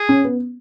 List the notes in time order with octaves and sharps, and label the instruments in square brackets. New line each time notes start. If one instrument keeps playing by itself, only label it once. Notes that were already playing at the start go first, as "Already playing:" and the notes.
Already playing: [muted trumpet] G#4
[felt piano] C#4
B3